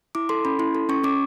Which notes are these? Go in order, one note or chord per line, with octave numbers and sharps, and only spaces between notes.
E4 D6
A4 C6
C#4 B5
E4 C6
A4
C#4 C#6
C#4 D6